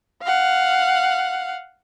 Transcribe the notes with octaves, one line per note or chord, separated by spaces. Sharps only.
F5 F#5